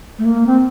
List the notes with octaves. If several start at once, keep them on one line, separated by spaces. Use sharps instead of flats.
A3
A#3
C4